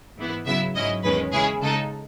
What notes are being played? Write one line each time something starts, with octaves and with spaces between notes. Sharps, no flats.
G#2 E3 B3 E4
C#3 F#3 B3 E4 E5
G#2 F#3 C#4 E4 D#5
E2 D#3 G#3 C#4 B4
C#3 G#3 C#4 E4 G#4
C#3 G#3 D#4 A4